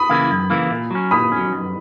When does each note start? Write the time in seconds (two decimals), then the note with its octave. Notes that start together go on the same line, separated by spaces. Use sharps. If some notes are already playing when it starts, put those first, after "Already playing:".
Already playing: B5 D#6
0.09 C#3 E3 A#3 E4
0.31 F#2
0.50 C#3 E3 A#3 E4
0.70 A#2
0.91 F#3 C#4
1.11 A#2 B5 D#6
1.32 F#3 C#4
1.53 F#2